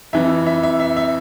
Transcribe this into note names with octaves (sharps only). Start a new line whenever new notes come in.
F2 E3 E5
E5
E5
E5
E5